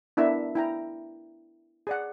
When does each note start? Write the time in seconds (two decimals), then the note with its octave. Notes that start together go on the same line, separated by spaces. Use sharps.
0.17 B3 D4 E4 A#4 E5
0.55 E4 G5 A#5
1.87 G#4 D5 F#5